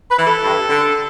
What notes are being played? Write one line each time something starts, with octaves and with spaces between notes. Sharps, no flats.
B4
E3
A4
G2
D3